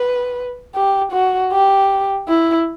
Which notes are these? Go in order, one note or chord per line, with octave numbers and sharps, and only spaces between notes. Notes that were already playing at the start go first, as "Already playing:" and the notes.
Already playing: B4
G4
F#4
G4
E4